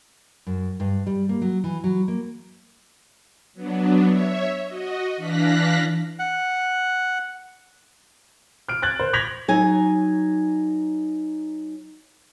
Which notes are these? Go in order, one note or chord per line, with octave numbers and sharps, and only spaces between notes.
F#2
G2
G3
A#3
F#3
E3
F#3
A#3
F#3 B3 D4
C#5 E5
F#4 D#5
E3 D4 F5 F#6 A#6 B6
F#5
F6 D7
F#6 G#6 A6 F#7
C5
G6 G#6 A#6 B6 F7 F#7
F#3 D#4 G#5